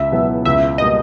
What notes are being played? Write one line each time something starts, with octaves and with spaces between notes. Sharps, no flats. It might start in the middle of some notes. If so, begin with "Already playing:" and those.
Already playing: C#2 E5
B2 F#3 B3 E4
C#2 E5
B2 G3 A#3 D#5